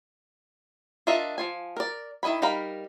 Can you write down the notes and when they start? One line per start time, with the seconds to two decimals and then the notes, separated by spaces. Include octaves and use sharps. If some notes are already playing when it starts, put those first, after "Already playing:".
1.07 D4 F4 A#4 D#5 E5
1.38 F3 F4 G#5
1.77 A#4 D5
2.23 D#3 E4 D#5 G#5 B5
2.42 G3 D#4 A#4 F5 B5